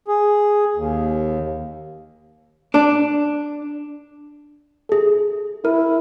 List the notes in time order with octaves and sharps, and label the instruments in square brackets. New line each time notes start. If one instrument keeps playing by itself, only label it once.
[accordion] G#4
D#2
[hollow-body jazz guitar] D4
[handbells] G#4 A4
[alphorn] E4 [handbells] A#4